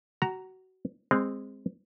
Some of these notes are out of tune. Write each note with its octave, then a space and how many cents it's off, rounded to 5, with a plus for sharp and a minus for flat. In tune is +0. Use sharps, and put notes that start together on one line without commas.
F#4 +20 A#5 +0
G#3 -20 C4 +0